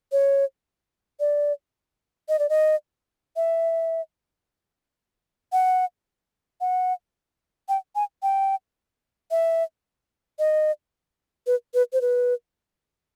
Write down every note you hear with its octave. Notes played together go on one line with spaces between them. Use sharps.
C#5
D5
D#5
D5
D#5
E5
F#5
F#5
G5
G#5
G5
E5
D#5
B4
B4
C5
B4